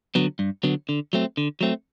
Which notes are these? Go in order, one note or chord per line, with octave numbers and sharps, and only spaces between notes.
D3 F#3 B3
G2
D3 F#3 B3
D3
F#3 A3 C4
D3
F#3 A3 C4